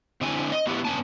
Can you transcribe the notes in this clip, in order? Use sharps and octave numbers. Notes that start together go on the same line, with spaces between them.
D3 C4 D4 E4 G#5
D#5
A#3 B3 E4 F#4 G4
G2 B3 C#4 G#5 A5